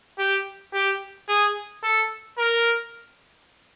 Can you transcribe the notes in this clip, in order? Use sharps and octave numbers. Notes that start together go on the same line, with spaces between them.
G4
G4
G#4
A4
A#4